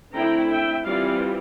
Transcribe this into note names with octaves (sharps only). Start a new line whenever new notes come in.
D3 A3 C4 E4 G5 A#5
E5 G5
E3 G3 C4 F4 D5 F5